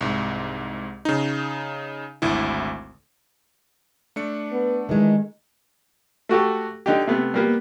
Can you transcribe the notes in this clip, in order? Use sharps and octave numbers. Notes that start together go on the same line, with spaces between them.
C2 G#2
C#3 D#4
G#1 D2 E4
A3 D4 C#7
B3
D#3 E3 G#3
A3 F#4 G4 A4
D3 D#4 G4
C3 A3 B3
G3 A#3 B3